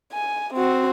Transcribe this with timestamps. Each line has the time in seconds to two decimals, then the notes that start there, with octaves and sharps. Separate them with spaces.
0.12 G#5
0.54 C4 F#4